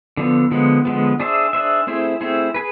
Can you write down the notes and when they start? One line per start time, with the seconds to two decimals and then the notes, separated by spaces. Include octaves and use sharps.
0.17 D3 F3 B3
0.51 D3 F3 G#3 B3
0.85 D3 F3 G#3 B3
1.20 D4 G#4 C5 E5
1.53 D4 G#4 C5 E5
1.87 A3 C4 E4 G#4 C5
2.21 A3 C4 E4 G#4 C5
2.54 G#4 B4